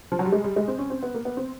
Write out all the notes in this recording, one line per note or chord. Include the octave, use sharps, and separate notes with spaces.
F3
F#3
G3
G#3
G3
G#3
C4
C#4
C4
B3
A#3
B3
C4